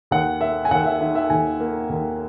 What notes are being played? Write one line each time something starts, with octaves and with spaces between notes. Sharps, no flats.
D#2 F#5
A#3 E5
G#5
D#2 F#5
E5
D#3 E5
E5
D#2 G#5
A#3
D#2